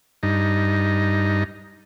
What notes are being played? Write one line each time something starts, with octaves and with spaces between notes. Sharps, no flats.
G2 D#4